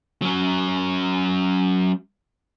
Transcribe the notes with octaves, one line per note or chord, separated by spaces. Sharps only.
F#3 C#4